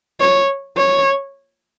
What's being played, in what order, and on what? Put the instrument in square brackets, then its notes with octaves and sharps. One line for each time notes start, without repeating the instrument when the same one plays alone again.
[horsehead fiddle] C#5
C#5